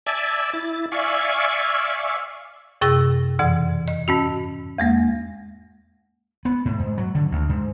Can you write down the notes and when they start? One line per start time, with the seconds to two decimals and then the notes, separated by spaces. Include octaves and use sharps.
0.07 D5 E5 G#5 A5
0.53 E4 A6
0.92 D5 E5 F5 G#5 C#6
2.81 F#2 C3 G#4 E6 A6 A#6
3.39 F2 B2 E3
3.88 D#5
4.08 G#2 C#4 F#4
4.78 E2 G#3 A#3
6.45 B3
6.65 A2
6.79 G#2
6.98 F#3
7.15 D3
7.31 D2
7.49 G#2